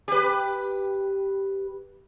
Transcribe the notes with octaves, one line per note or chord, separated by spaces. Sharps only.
G4 B4